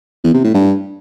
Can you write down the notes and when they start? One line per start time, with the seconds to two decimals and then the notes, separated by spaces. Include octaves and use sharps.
0.24 E2
0.34 C3
0.44 A2
0.54 G2